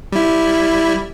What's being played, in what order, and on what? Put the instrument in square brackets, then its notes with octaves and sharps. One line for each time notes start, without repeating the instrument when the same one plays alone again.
[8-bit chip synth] G3 E4